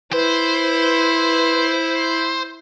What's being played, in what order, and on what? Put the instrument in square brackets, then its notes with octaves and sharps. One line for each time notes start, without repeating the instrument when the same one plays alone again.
[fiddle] E4 [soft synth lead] B4 [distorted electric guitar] C5